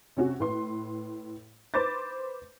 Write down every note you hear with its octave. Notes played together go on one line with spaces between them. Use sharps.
C3 C#4 F#4
A2 B4 C6
B4 C5 B5 D6 G6 A6